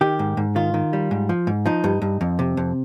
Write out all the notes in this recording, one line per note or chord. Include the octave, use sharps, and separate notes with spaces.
D#3 G4
G#2
G#2
D#3 F4
D#3
G3
G#2
F3
G#2
F3 D#4
G2
G2
F2
C3
F2